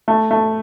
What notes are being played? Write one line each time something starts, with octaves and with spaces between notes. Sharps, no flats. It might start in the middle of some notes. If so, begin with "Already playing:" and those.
A3
A3